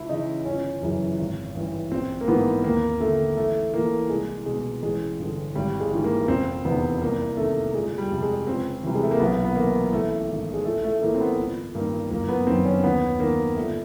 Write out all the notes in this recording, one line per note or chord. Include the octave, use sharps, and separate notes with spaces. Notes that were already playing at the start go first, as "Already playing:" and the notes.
Already playing: C#2 E4
C#3 E3 D#4
G1 C#4
F#2 C#3 E3
G#1
G2 E3
A#1 C4
A#3
G#2 E3 B3
D#2 A#3
D3 A3
A1 A3
A2 E3 A#3
C2 G#3
B2 G#3
A1 G#3
G2 D3
G#1 G3
G#3
G#2 E3
A#3
F1 C4
E2 C3 D#3 B3
C2 A#3
C3 D#3 A3
G1 G#3
G3
F2 C3
G#3
C#2 C4
C3 E3 G3
G#3
A3
A#3
B1 B3
B3
A2 E3 A#3
A1 A3
G#2 D#3
G#3
A#1 A3
A3
A2 E3 A#3
C4
B3
G1
G2 D#3 A#3
F#1 A#3
B3
F#2 D#3 C4
C#4
D#2 B3
D#3 A#3
G1 A3